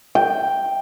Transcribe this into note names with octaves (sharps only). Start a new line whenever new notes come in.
G5